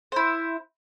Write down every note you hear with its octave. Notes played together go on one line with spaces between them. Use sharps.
E4 C5